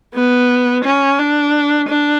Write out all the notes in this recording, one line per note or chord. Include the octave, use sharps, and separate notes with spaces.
B3
C#4
D4
D4